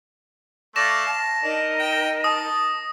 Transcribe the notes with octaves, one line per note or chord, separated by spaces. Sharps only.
A3 D5 F5 F6 A#6 E7
A5
D4 D#4 A#4 D#5
G5
A5 D#6